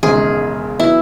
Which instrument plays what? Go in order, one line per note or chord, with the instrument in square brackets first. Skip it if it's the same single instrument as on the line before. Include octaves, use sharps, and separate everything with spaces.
[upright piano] E1 D#2 C#3 G#3 D#4 [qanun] G#4
[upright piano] F#3 B3 [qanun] E4